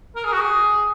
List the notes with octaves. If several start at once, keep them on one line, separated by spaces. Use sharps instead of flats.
A#4
G#4
F#4
G#4